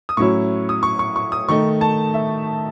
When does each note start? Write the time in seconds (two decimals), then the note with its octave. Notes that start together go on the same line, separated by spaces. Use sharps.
0.09 D#6
0.17 A2 F#3 C#4 E4 C#6
0.69 D#6
0.83 C#6
0.99 C#6
1.16 C#6
1.32 D#6
1.48 D#3 A3 D#4 C#6
1.81 A5
2.14 E5